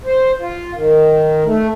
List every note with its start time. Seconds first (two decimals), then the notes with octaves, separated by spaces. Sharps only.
0.04 C5
0.40 F4
0.75 D#3
1.44 A3